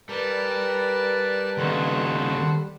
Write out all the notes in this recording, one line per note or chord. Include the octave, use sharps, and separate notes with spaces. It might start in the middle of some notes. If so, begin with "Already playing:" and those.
G3 A#4 B4 D5 A5
D#2 C#3 A4 C5 F#5